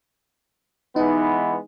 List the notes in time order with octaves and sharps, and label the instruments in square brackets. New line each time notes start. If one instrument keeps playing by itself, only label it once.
[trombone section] E3 G#3 B3 [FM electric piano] D#4